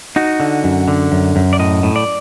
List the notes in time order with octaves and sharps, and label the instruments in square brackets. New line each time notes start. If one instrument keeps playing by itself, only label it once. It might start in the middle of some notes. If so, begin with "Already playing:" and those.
[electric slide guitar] D#4 F#4
D3
F#2
D3
F#2
F#2
D5
A2 D#5
A2
D5